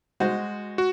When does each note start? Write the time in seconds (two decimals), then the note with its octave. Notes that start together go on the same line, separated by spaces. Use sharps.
0.20 G#3 F#4 C5
0.78 F#4